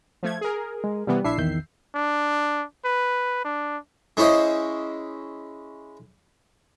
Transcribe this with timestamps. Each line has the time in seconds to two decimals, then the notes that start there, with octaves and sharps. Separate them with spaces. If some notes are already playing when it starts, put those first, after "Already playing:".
0.23 F3 A3 G#6
0.41 G#4 A#4
0.84 G#3
1.07 C3 E3 G3 B3
1.24 A#1 D4 E4 E5 C7
1.38 E2 D#3 G6
1.95 D4
2.85 B4
3.45 D4
4.17 G#3 C#4 E4 C5 D#5